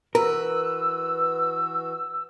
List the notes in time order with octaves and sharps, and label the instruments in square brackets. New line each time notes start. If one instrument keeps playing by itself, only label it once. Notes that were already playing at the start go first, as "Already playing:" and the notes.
[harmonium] E3 F#4 [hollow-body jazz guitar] A#4 [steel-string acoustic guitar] B4 [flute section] E6